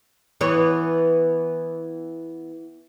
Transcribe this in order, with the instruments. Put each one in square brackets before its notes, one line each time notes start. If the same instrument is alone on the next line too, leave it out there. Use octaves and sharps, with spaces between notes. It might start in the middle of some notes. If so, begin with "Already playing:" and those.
[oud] E3 B3 C#5